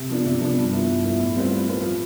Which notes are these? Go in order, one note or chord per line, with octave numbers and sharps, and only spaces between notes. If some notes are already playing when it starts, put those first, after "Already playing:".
Already playing: C3
F3 B3 D4
C3
F3 B3 D4
G2
F3 B3 E4
G2
F3 B3 E4
A2
G3 C4 F4 B4
A2
G3 C4 F4 B4
F3